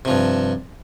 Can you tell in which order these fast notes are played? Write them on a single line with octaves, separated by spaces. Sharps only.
C3 F3 G2